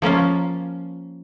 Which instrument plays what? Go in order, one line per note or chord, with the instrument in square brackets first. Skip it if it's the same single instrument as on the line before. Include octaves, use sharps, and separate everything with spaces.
[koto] F3 A#3 C#4 F4